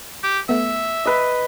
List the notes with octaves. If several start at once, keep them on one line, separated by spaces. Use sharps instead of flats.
G4
A3 B3 E5
B4 D#5 B6